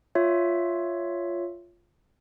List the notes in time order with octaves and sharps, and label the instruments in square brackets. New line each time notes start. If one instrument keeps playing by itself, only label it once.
[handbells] F4 C#5 E5